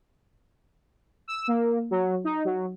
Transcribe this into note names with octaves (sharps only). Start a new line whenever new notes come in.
E6
A#3
F#3
D#4
F#3